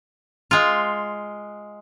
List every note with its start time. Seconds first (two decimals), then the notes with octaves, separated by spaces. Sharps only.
0.51 G#3 F4